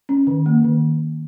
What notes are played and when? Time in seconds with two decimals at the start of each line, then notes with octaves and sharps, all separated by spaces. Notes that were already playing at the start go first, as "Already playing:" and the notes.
0.09 C#4
0.27 D#3
0.46 A#3
0.64 D#3